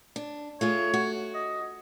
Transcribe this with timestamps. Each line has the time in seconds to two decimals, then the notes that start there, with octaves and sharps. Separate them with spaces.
0.16 D4
0.61 A3 F4 G#4 C#5
0.94 F#4
1.35 D#5